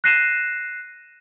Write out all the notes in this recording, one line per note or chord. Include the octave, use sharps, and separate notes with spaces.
F#6 A#6 C7 D#7 E7